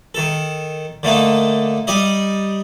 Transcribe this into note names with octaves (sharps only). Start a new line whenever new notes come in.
D#3 A4
D3 A3 A#3 D#4
G3 D#4 D5 D#5